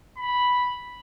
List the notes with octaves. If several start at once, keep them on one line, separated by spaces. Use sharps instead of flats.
B5